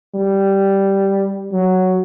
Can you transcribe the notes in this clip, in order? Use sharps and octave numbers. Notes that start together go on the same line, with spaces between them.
G3
F#3